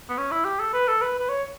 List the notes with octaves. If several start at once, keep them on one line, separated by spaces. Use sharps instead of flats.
B3
C#4
E4
G4
A4
B4
A4
B4
B4
C#5